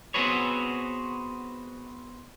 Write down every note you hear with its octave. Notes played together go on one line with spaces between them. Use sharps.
B3 C4 F#4 G#4 B4 C#5